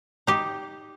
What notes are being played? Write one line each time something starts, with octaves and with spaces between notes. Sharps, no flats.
D#4 G4